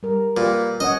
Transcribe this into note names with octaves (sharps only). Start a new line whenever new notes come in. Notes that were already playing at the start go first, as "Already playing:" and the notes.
G3 A#4
A#2 G4 B4
C#4 C#5 D#5 F#5